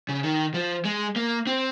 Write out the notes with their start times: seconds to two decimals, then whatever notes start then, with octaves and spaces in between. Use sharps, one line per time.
0.09 C#3
0.23 D#3
0.54 F3
0.85 G#3
1.16 A#3
1.47 C4